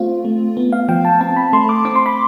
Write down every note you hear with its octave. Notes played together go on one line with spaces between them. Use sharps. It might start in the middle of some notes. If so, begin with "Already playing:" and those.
Already playing: A3 C4 F4
A3
B3
F5
F3 G5
A5
C4 A5
B5
A3 C6
D6
C4 D6
C6
B5